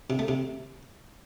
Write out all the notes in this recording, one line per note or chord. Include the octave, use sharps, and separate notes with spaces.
C3
A3
C3